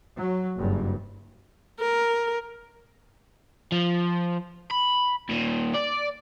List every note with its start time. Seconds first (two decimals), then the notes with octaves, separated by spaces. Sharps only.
0.16 F#3
0.56 F#1 G2
1.80 A#4
3.72 F3
4.71 B5
5.29 D#2 A#2
5.74 D5